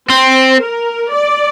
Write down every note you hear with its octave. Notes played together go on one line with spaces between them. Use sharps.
C4 C5
A#4
D5